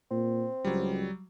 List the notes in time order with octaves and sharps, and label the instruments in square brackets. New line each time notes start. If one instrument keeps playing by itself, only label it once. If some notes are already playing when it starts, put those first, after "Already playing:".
[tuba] A#2 [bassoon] C4
[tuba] C#2 [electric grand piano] F#3 G3